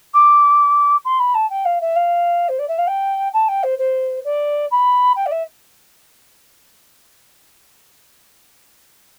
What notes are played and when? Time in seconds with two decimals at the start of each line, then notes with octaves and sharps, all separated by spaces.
0.14 D6
1.05 C6
1.19 B5
1.34 A5
1.50 G5
1.65 F5
1.81 E5
1.96 F5
2.49 C5
2.59 D5
2.68 E5
2.78 F5
2.87 G5
3.33 A5
3.48 G5
3.63 C5
3.78 C5
4.24 D5
4.71 B5
5.16 G5
5.26 D5
5.31 E5